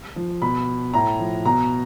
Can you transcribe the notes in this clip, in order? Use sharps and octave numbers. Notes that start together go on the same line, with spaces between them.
F3
B2 B5
A2 A#5
F3
B2 A#5